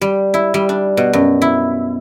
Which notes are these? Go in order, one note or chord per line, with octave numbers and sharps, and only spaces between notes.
G3
E4
G3
D4
B2
F#2
E4